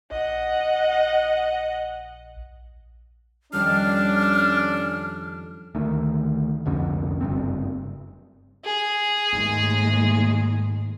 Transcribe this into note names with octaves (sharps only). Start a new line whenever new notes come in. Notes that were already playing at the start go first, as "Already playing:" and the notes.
A#1 D#5 F#5
F2 D#3 G3 C#4 D4 F6
D2 D#3
C2 F2 D3 C#4
F#1 G2 C4
G#4
D#2 G#2 G#3 A3